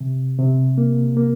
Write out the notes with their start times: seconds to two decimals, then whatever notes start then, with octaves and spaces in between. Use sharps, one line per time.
0.01 C3
0.39 C3
0.78 A#3
1.17 A#3